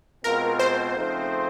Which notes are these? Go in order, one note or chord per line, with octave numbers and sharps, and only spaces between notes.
B2 G#3 C4 F4 A#4
C5
C#3 F3 A3 C4 D#4